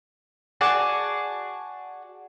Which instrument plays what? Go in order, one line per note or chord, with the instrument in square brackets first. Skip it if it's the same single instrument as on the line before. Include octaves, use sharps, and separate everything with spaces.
[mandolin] F#4 G#4 D5 A5